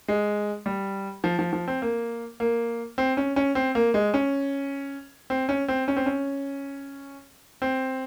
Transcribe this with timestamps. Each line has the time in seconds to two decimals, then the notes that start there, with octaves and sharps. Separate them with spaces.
0.08 G#3
0.66 G3
1.24 F3
1.39 F3
1.53 F3
1.68 C4
1.82 A#3
2.40 A#3
2.98 C4
3.17 C#4
3.36 C#4
3.55 C4
3.75 A#3
3.94 G#3
4.14 C#4
5.30 C4
5.49 C#4
5.68 C4
5.88 C#4
5.96 C4
6.06 C#4
7.62 C4